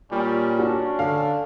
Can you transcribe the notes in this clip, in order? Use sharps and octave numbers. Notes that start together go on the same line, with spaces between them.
A#2 G3 C#4
D4 F#4
D3 F5